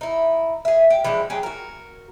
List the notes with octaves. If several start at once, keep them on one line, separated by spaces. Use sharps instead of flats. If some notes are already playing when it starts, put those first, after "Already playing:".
D#4 E4
G#4 E5
G4
E3 F3 G#3 D4
F#3 G4 G#4
F#4 A#4